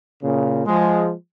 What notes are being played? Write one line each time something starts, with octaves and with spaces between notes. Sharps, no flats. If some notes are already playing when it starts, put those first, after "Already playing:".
A#2 C#3
F3 G#3